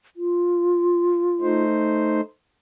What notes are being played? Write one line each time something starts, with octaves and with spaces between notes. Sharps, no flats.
F4
A3 D#4 C5